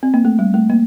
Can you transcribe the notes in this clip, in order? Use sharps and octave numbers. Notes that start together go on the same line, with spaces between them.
C4
A#3
A3
G3
A3
A#3